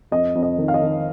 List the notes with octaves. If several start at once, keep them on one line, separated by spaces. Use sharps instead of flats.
F2 D#5
F2
D#5
D#3
F5
D#5
D#3